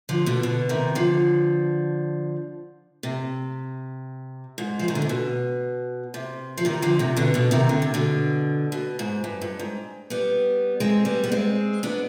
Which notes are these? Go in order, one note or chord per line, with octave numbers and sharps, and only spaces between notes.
D3 F3
B2 D3
B2 D3
C3 D#3
D3 F3
C3
G#2
F3
D#3
D3
C3
B2
C3
F3
C3 D#3
D3 F3
C3 D#3
B2 D3
B2 D3
C3 D#3
D3
C3
B2 D3
B2
G#2
G2
G2
G#2
G3 B3
G#3 C4
G3 B3
B3
G#3 C4
B3 D4